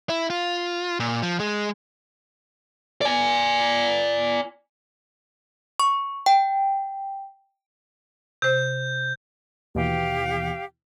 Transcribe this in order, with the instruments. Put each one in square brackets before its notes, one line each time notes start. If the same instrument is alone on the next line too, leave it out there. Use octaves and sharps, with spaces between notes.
[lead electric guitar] E4
F4
A#2
F3
G#3
D5 G#5
[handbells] C#6
G5
[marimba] C3 C5 [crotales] G6
[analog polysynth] D#2 B2 E3 [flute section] G4 F5 G5